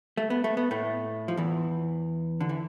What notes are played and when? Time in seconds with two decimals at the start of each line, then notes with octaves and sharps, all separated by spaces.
0.17 A3
0.30 B3
0.44 A3
0.57 B3
0.71 A2 A3
1.28 F3
1.37 E2 E3
2.41 D3
2.49 E3